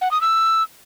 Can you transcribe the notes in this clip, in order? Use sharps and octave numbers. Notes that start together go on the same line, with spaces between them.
F#5
D#6
E6